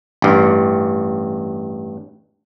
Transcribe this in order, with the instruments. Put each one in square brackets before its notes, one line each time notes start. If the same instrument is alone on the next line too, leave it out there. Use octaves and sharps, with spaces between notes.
[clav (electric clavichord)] A1 G2